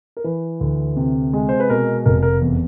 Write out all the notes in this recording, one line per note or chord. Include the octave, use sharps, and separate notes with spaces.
A#4
E3 B4
D2
C3
G#3
C5
B4
B2 A#4
F1 A#4
A#4
E2